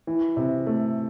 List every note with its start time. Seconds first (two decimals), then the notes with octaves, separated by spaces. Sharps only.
0.07 E3
0.37 C3
0.66 A3